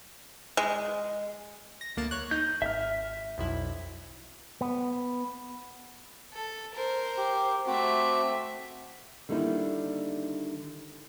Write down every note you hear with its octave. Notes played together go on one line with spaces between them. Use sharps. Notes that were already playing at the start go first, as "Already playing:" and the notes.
G#3
A#6
D2 A#3 A5
C#5 F#6
D#4 G6
G#1 E5 F6
B1 F2 E4
B3
A4
A#4 C5
G4
A3 C4 F#4 E5 D6
D3 D#3 G3 A#3 D#4 E4